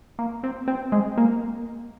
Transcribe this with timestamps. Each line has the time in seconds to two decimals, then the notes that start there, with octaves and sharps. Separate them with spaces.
0.19 A#3
0.43 C4
0.68 C4
0.92 G#3
1.18 A#3